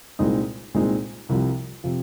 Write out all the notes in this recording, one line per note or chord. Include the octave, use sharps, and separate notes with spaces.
C2 A#2 G#3 C4 D#4
C2 A#2 G#3 C4 D#4
C2 C3 F3
C3 F3